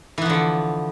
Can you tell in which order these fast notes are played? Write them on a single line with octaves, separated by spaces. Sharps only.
E3 B3 F3 D3